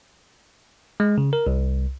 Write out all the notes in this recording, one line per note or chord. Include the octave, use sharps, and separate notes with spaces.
G#3
C#3
A#4
C2